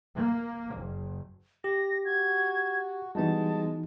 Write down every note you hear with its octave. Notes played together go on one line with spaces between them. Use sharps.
A#3
F#1
G4 A#6
F#4 G#6
E3 G3 G#3 B3 D#4 F#4 A5